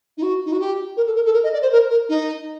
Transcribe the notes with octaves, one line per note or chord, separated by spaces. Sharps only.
D#4
F#4
D#4
F#4
G4
A#4
A4
A#4
A4
A#4
D#5
D5
C5
A#4
A#4
D#4